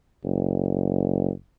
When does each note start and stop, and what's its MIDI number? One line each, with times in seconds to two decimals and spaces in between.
0.24 1.31 30